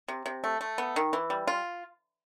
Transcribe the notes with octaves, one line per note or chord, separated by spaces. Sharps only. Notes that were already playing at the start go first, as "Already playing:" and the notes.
C3
C3
A3
A3
B3
D#3
E3
G3
F4